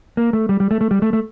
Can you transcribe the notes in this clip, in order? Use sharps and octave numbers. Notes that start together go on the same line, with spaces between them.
A#3
A3
G3
G3
A3
A3
G3
A3
A3